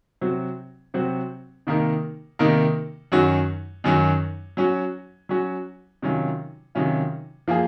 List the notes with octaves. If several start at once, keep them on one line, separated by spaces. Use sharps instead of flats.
C3 F#3 C4 F#4
C3 F#3 C4 F#4
C3 D#3 A#3 D#4 A#4
C3 D#3 A#3 D#4 A#4
F#2 D#3 F#3 C#4 F#4
F#2 D#3 F#3 C#4 F#4
F#3 C#4 F#4
F#3 C#4 F#4
C3 D#3 F#3 C#4 F4
C3 D#3 F#3 C#4 F4
F3 A#3 F4 G#4